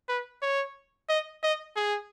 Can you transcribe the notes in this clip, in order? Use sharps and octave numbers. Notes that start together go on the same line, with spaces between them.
B4
C#5
D#5
D#5
G#4